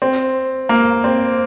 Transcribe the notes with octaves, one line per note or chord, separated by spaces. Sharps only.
C4
A#3
C4